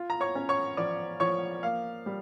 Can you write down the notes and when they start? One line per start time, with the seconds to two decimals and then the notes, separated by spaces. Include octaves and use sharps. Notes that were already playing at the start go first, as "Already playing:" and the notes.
Already playing: F4
0.10 A#5
0.21 C#5 C#6
0.35 C#4
0.49 C#5 C#6
0.77 F3 D5 D6
1.20 F3 C#5 C#6
1.63 A#3 F5
2.06 G3